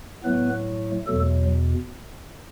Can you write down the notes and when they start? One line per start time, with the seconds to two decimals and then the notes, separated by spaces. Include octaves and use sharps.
0.24 A2 F#3 A3 B3 B4
1.07 E2 B2 F#3 A3 A4